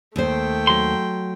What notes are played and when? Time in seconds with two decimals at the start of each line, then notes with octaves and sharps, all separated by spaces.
0.16 D#2 A3 C5 G5
0.67 F#3 C6